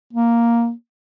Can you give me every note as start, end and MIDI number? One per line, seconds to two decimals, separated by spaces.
0.13 0.71 58